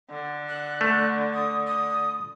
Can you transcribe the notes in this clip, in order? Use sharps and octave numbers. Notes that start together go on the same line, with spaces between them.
D3
F#6
A3
D#6
D#6